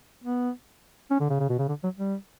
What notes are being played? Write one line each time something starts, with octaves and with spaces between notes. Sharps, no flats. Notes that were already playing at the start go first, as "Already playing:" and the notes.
B3
C#4
D3
C#3
C#3
B2
C#3
D3
F#3
G3